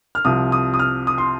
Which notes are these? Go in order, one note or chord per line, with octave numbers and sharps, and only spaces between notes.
F6
C2 C3 F3 D#6
D#6
D#6
F6
D#6
C6